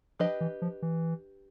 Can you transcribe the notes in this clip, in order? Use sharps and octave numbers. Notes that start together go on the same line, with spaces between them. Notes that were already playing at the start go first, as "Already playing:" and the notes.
F3 D4 G4 B4 D#5
E3
F3
E3